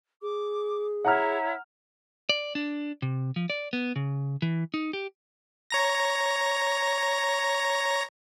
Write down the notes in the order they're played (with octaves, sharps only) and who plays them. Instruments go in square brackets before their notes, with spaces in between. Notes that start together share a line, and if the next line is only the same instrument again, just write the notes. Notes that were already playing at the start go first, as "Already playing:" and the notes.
[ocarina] G#4 [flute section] D6
[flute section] E4 C#5 [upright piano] F#5 A#5 F6
[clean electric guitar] D5
D4
C3
F3
D5
B3
C#3
E3
D#4
G4
[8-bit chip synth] C#5 A#5 A#6